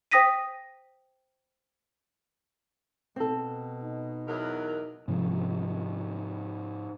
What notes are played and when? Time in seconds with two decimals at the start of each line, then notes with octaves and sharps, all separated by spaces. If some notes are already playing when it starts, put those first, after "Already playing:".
0.11 C5 G5 D#6 A#6 B6 D#7
3.16 B2 C4 A4
3.83 D#4
4.28 E2 F#3 A#4
5.08 G#2 C3 F3